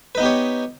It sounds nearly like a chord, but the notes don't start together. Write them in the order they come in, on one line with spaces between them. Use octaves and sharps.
B4 D#4 B3 G4 C#5